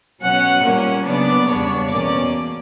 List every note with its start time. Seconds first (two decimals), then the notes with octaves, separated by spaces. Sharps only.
0.22 B2 F#3 C#4 F#5
0.64 A#2 G3 A#3 C#4
1.06 C#3 F#3 B3 D4 D5
1.48 E2 C#3 G3 B3 D4 C#5
1.90 E2 B2 A#3 C#4 D5